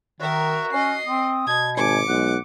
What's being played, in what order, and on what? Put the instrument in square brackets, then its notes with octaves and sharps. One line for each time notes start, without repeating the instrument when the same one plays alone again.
[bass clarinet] D#3 [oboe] F#4 [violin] A#4 E5
[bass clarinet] C#4 [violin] D#5 C7
[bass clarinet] C4 [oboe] D#6
[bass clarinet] B2 [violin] G#6
[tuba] G#1 [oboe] G#5 [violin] D6 C#7
[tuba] B1 [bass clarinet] G#3 [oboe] F#5